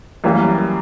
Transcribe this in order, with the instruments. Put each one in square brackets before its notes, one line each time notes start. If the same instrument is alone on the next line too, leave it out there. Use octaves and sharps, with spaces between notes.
[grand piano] F#2 E3 G3 A#3